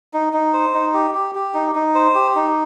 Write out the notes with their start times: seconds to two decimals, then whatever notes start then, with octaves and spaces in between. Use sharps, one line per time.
0.13 D#4
0.33 D#4
0.53 C5
0.74 D#4
0.94 G4
1.15 G4
1.35 G4
1.54 D#4
1.75 D#4
1.95 C5
2.15 G4
2.35 D#4